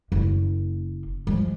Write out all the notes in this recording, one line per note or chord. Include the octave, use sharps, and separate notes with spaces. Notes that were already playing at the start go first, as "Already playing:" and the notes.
F#1 A#3
F3 G#3